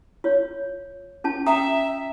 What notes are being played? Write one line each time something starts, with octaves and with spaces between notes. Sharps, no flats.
F4 C#5
C#4 F4 A5
E5 G5 A#5 D#6